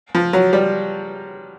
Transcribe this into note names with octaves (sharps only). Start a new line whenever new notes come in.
F3
F#3
G3